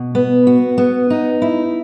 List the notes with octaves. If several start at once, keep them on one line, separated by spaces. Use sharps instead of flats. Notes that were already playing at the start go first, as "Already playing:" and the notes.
Already playing: B2
B3
F#4
B3
D#4
E4